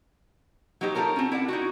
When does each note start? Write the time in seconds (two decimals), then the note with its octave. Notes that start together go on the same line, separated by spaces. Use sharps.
0.81 F#3 A#3 D#4 G4 A#4 C5
0.95 D#4 F4 G4 A4 A#4 C#5
1.16 C4 C#4
1.32 E4 D5 F#5
1.48 D#4 E4 F#4